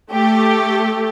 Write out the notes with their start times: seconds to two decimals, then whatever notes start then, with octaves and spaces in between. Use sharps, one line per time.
0.12 A3 G4